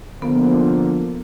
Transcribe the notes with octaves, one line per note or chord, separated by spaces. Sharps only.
D3 F3 A#3 B3